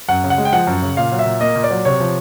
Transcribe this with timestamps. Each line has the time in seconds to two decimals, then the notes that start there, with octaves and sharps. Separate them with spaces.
0.09 F#2 F#5
0.24 C#3
0.30 F#5
0.38 G#3
0.45 G5
0.52 F3 F#5
0.67 F#2
0.82 C#3
0.97 A#2 F5
1.12 F#3
1.19 E5
1.26 A#2
1.41 A#3 D#5
1.55 A#2
1.64 D5
1.71 F#3
1.85 C3 C#5
2.00 F3